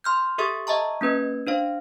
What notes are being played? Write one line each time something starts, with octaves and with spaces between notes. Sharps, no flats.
C6 F6 G6
G4 A4 E5 C#6 D#6 A6
D#5 E5 A5 A#5 C#6
A#3 C#4 B4 G#6
D4 C5 F5